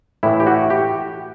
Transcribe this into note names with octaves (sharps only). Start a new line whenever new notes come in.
A2 E3 E4
G4
F#4
G4